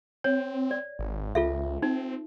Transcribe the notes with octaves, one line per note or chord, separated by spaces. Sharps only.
C4 C#5
D5
G#1
C#2 F4 A4 E5
C4 D#4